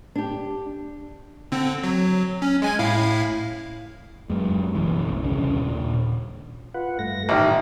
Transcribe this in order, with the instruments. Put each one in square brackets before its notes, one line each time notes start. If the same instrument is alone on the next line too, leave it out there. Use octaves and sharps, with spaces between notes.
[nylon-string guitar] D4 G4
[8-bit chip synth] D3 C4
F#3
C#4
G#3 G#5 G#6
A2 E4 F5
[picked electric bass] F#2 G#3
F#1 B1 E3
D#1 C2 C#3 D4
D#1 A#2
[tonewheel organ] F4 B4 F#5
G2 A3 A#6
[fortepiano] A1 D#3 [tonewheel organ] A2